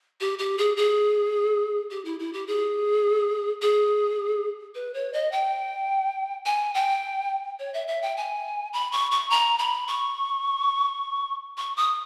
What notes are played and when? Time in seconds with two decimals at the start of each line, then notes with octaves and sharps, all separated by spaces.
0.21 G4
0.39 G4
0.58 G#4
0.77 G#4
1.91 G4
2.05 E4
2.20 E4
2.33 G4
2.47 G#4
3.62 G#4
4.75 B4
4.94 C#5
5.13 D#5
5.32 G5
6.46 G#5
6.74 G5
7.59 C#5
7.74 E5
7.88 E5
8.02 G5
8.17 G#5
8.73 B5
8.92 C#6
9.11 C#6
9.30 A#5
9.59 B5
9.88 C#6
11.58 C#6
11.77 D#6